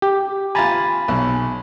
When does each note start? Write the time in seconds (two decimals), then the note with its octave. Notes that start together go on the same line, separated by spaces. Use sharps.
0.02 G4
0.55 F4 G#5 A#5 B5 A6
1.08 B1